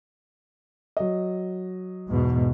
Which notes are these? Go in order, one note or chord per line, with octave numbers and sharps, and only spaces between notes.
F#3 D#5
E2 G#2 B2